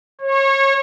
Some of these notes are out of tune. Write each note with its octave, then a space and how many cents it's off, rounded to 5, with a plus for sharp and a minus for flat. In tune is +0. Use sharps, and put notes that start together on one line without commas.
C#5 -30